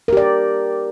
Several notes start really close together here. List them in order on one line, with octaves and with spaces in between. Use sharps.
A#4 G4 D5